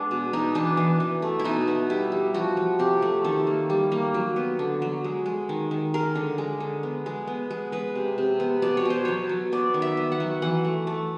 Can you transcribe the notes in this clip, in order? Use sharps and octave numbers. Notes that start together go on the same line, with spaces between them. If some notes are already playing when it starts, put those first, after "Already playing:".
Already playing: G#3 B3 D4
B2
B2 D#4
E3 D4
E3
E3
A3
E4
B2 D#4
B3
G3 E4
G3
F3 F#4
F3
C3 G4
A3
D#3 A4
A#3
G3
A#3
F#3
B3
D3
F#3
G#3
G#3
D#3
D#3
G#3 A#4
D3
G#3
D3
B3
G#3
B3
G#3
G#3 B4
C3
C3
B3
B2 D5
C#5
B2 C5
F#3 C#5
F#3
B3 D5
D#3
E5
B3
F#5
F#3
E3 F#5
A3
A3